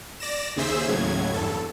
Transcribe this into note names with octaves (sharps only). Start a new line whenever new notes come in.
D5 A#6 E7
D#2 C#3 G#4 C5 E5 E6
D#2 A2 C#3 F#3 G#6
E2 G2 A4